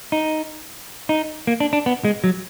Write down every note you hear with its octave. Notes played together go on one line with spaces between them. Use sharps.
D#4
D#4
A#3
D4
D4
B3
G#3
F#3